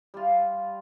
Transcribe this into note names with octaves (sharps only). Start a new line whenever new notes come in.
G3 F4